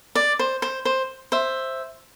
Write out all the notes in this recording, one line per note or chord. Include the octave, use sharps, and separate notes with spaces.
D5
C5
C5
C5
C5 E5